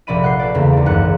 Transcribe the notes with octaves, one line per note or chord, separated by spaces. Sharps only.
F1 A#1 D5 B5 D#7
F#5 F#6 G6 C7
A4 B4 D5
E2 C#3 A#3 C4
D#2 D5
G#1 C#2 F#2 E3 F#6 C#7